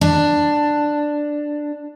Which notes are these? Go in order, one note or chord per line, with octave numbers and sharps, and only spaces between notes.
D4